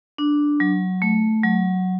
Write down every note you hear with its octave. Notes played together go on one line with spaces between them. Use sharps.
D4
F#3
A3
F#3